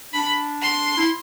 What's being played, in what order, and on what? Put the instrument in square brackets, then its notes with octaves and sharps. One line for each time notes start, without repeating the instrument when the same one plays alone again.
[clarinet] D4 [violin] B5
[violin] C6
[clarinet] E4